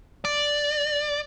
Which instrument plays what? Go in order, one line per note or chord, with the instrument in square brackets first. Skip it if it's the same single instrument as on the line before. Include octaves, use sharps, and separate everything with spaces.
[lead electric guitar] D5